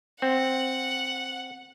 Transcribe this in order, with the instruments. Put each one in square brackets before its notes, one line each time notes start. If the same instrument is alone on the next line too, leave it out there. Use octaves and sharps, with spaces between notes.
[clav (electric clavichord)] C4 [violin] F#5